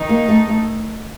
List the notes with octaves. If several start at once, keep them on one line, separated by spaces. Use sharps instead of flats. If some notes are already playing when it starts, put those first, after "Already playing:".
Already playing: D#3 D#4
A#3
A3
A3